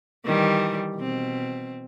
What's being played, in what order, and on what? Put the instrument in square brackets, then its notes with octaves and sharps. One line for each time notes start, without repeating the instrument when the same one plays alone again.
[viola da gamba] D#3 E3 G3
B2 C4